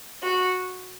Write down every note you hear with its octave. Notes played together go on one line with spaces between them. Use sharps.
F#4